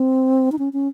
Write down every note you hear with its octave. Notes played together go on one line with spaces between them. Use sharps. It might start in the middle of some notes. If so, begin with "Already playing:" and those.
Already playing: C4
D#4
C#4
C#4